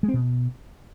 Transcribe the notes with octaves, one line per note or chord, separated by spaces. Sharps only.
G#3
C4
B2